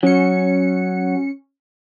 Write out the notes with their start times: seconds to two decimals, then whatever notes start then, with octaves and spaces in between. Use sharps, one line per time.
0.03 F#3 C#4 C#7